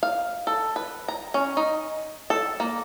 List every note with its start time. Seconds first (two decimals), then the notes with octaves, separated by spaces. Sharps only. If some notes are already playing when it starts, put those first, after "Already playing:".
0.03 F5
0.47 A4
0.76 B4
1.08 A#5
1.34 C#4
1.57 D#4
2.30 A4
2.60 A#3